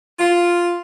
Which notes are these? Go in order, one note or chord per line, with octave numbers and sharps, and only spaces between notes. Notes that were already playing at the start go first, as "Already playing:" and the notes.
F4